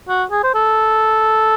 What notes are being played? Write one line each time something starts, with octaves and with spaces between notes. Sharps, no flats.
F#4
G#4
C5
A4